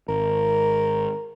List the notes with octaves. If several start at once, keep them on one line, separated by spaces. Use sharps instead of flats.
G#1 A#4